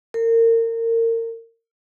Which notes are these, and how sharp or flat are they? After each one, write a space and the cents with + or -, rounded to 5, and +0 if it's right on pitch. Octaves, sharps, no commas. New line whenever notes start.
A#4 -30